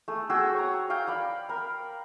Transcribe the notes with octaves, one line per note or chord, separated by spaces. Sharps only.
A3 G#4
F#4 G#4 G5 E6
C#5 A#5
D#5 F5 G5
D5 F5 B5
A#4 B5